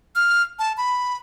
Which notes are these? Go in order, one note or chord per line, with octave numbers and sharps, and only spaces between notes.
F6
A5
B5